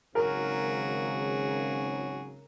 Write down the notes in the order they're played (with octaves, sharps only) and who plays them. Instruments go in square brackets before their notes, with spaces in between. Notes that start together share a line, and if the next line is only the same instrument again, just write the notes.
[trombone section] G#1 C#3 [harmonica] F#3 G#4 [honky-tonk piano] A#4